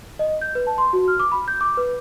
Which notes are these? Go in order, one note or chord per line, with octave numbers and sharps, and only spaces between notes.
D#5
G6
B4
A5
C6
F#4
F6
D6
B5
G6
D6
B4